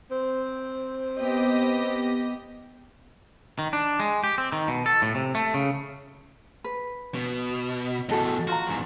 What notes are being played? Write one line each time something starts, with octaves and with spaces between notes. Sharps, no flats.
C4
B3 G4 D#5
D#3
D4
G#3
G4
C4
D#3
B2
A4
A2
C3
A3
C#3
B4
B2
E2 A2 F#4 A4 D#5
F4 F#4 A#5
E2 G#2